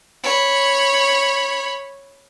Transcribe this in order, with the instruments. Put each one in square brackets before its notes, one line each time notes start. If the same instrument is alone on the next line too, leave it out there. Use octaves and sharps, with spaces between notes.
[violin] C#5 B5